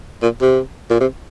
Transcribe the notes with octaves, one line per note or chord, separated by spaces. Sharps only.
A#2
C3
A#2
C3